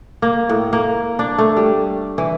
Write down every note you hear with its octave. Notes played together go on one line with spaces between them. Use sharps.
A#3
A2
A#3
D4
A3
G3
E3